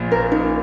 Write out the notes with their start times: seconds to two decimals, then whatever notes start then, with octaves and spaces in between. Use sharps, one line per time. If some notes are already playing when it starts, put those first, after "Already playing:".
Already playing: A#1 A#2
0.12 A#4
0.32 D#4